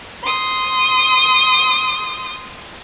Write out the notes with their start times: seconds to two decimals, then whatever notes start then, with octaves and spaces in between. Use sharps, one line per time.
0.24 C6 D#6